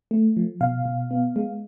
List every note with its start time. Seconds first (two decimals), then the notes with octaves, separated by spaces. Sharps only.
0.11 A3
0.37 F3
0.61 B2 F5
0.85 B2
1.11 B3
1.36 G#3